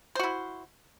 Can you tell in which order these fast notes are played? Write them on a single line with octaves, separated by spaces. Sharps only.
C5 F#4 E4